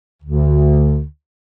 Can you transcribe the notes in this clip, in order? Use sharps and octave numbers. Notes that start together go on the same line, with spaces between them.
D2 D3